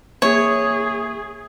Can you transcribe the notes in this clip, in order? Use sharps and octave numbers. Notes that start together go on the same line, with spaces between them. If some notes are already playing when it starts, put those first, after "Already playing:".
A#3 G#4 C#5 E5